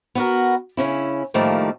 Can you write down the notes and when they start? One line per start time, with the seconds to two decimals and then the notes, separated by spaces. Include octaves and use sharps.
0.15 B3 F#4 A#4
0.77 C#3 C#4 E4
1.34 A2 D#3 F3 G3 A3 A#3